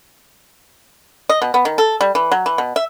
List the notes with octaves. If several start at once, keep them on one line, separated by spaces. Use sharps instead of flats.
D#5
B2
B3
D#3
A4
G3
E3
F#3
E3
B2
E5